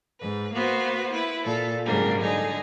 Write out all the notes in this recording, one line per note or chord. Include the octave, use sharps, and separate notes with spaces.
G#2 B4
A#3 B3 F#4 B4 C5
E4 B4
A#2 A4
G#2 C#3 F#3 G3 A#3 D4
D3 D#4 G#4